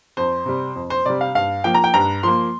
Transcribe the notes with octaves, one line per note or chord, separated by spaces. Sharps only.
F2 C5
C3 G3
F2
C5
C3 G3 D5
F5
G2 F5
F3 A#3 G5
A#5
G5
G2 A#5
F3 A#3 C6